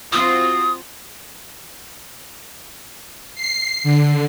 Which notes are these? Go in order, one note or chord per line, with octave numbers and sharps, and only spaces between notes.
C4 F4 F#4 D#6
C7
D3